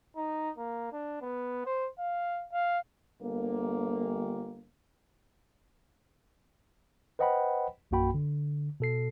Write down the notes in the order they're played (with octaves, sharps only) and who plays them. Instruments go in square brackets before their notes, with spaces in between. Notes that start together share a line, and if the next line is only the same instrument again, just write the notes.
[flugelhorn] D#4
A#3
D4
B3
C5
F5
F5
[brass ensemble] G1 A#3
[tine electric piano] B4 C5 D#5 F#5 G5 B5
A#1 F#2 A#3 F#4 G5 B5
D3
B2 A4 C7